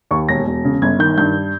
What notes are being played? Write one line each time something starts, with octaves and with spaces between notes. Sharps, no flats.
D#2 C#6
E1 A#6
E1
C#3
G1 G#6
D#3 G6
G2 G6